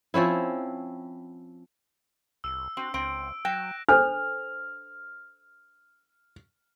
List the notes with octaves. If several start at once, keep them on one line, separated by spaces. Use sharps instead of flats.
F3 C4 C#4 E4
C2 E6
C4 F#4
C#2 C4 D7
F#3 G5 F#6 A#6 E7
D4 A4 C5 F6